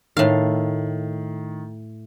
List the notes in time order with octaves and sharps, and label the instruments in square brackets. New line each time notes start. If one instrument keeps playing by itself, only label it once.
[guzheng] A2 F5 [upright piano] D#3